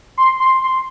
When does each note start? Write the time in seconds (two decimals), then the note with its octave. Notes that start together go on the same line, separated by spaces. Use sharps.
0.18 C6
0.40 C6
0.61 C6